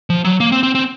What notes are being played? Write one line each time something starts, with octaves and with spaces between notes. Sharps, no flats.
F3
F#3
A#3
C4
C4
C4